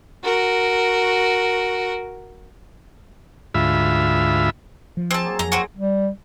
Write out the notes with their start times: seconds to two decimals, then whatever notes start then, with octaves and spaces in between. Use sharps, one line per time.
0.24 F#4 A#4
3.54 D2 G#2 F4 E5 B5
4.97 F3
5.11 C4 G#4 A4 A5
5.25 F#3 A#3
5.39 F2 A#5
5.52 C4 F#4
5.77 G3